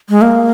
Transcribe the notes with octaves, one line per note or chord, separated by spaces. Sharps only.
G#3
A#3